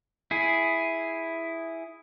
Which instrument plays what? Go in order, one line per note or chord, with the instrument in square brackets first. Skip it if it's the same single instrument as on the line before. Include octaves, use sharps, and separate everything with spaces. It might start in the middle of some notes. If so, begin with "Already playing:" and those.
[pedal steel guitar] E4 G#4